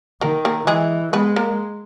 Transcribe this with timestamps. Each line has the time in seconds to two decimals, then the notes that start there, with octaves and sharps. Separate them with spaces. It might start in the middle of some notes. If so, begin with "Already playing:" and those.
0.21 D#3 A#3 A#4
0.45 A#3 A#4
0.67 E3 G#3 G#4
1.13 G#3 B3 B4
1.36 A#3 A#4